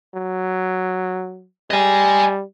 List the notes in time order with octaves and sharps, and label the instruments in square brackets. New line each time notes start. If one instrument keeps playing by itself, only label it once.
[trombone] F#3
[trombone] G3 [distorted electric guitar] D#5 G#5